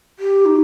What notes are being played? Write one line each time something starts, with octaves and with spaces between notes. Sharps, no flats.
G4
D#4